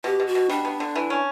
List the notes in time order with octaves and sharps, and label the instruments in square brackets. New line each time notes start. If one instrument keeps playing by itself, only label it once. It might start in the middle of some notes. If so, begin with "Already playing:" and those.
[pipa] B2 [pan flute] G4
[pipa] B2
[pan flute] F#4
[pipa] B2
[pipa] G3 [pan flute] D4
[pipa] B3
D3
E3
C#4